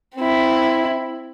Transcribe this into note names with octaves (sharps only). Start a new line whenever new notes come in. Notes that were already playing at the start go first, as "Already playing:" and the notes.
C4 E4